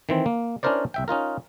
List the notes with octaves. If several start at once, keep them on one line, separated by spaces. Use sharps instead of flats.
D#3 E3 C4
A#3
C#4 D4 E4 A#4 C5 D5
C2 E5 G5
C#4 D#4 F4 A#4